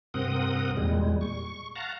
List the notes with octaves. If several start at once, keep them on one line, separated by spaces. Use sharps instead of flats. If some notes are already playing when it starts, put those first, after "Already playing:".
G2 C3 C4 A#4 F#5 D#6
E2 A#2 G3 G#3
C#6
F5 F#5 A5 A#5